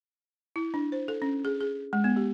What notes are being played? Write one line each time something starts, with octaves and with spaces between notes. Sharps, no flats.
E4
D4
C5
A4
C#4
G#4
G#4
G#3
B3
G4